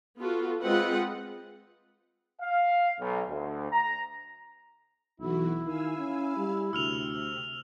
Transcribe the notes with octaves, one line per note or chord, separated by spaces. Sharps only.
B3 F4 F#4 A4
G#3 C4 F4 B4 D#5 F#5
F5
B1
D2
A#5
B1 E3 E4 F#4
D#3 F5 G#5 E6
C#4
G3
D2 C3 E6 F6 F7